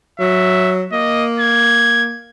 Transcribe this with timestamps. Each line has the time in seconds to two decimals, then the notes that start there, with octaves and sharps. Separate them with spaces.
0.20 F#3 E5
0.92 A#3 D#5
1.39 G#6